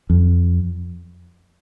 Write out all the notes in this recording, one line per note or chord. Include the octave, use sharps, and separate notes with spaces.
F2